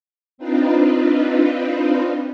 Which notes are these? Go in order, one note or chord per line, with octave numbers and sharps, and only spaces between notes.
C4 D4 D#4 F4 B4